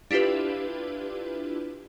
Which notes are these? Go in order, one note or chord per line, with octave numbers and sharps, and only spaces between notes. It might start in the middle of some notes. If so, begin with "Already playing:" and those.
D4 E4 F4 G4 B4